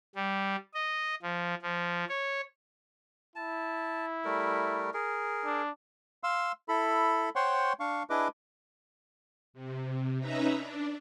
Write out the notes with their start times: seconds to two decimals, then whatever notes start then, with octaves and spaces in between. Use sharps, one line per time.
0.15 G3
0.74 D#5
1.22 F3
1.62 F3
2.09 C#5
3.36 E4 A5
4.25 G3 A3 A#4
4.94 G#4 A#4
5.45 D4
6.23 F5 C6 E6
6.69 E4 A4 B5
7.36 C5 C#5 F#5 G5 C6 C#6
7.80 D4 F5 C#6
8.10 D4 E4 G#4 B4 D#5 D6
9.54 C3
10.20 C#4 D#4 B4 E5 A#5
10.57 D4